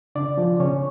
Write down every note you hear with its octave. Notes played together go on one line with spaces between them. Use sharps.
C#3 D4 D5
F3
C#3 C#4 C#5